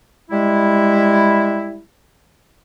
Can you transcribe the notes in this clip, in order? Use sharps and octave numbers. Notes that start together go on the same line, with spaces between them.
G3 G#3 E4